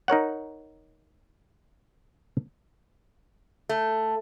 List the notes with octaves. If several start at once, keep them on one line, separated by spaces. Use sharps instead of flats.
D#4 A#4 C#5 F#5
A3